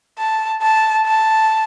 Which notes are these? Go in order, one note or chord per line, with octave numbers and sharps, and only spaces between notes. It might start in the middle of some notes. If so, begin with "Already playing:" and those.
A5
A5
A5